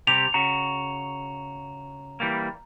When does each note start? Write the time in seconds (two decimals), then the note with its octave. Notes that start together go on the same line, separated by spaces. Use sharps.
0.07 C3 G3 G4 F7
0.34 C#3 F#4 A#5
2.20 E3 G3 A#3